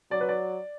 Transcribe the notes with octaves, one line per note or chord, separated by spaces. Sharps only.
F#3 D5
B4
D5